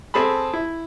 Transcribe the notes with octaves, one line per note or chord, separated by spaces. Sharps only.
C4 G#4 A4 A5 B5
E4